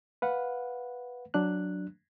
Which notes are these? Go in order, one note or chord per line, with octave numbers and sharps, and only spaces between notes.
B4 F5 F#5
F#3 D4 F#6